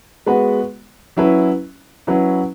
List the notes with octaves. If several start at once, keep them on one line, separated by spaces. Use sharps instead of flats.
G#3 B3 F#4 B4
F#3 C#4 E4 B4
F#3 C#4 E4 B4